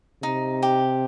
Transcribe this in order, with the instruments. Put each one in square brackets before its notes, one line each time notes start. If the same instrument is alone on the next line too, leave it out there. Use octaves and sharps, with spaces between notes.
[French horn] C3 [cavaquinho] D#4
[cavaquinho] G4